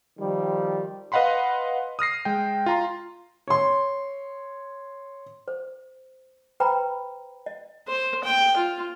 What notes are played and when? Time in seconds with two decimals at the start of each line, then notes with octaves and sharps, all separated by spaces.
0.19 D#3 F3 G3
1.12 B4 D#5 F5 F#5 B5 C6
1.99 D#6 F6 A#6 C7
2.25 G#3 G5
2.66 F4 A#5 C6
3.48 C#5 C6
5.48 C5
6.60 B4 C5 G5 A#5 B5
7.46 D#5
7.88 C5
8.24 G5
8.57 F4